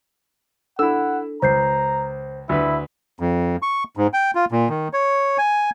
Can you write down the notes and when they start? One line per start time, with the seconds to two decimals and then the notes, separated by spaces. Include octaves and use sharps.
0.79 D4 E4 A4 F#5 E6
1.42 C#2 C5 A#5 G6 C7
2.49 D2 E4 B4
3.20 F2
3.62 C#6
3.97 G#2
4.14 G5
4.35 F4
4.51 A#2
4.70 D#3
4.93 C#5
5.38 G#5